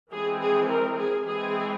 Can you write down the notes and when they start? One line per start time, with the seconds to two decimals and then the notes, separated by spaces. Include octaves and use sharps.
0.11 E3 G#3 C4 G#4
0.39 G#4
0.69 A#4
0.97 G#4
1.25 E3 G#3 C4 G#4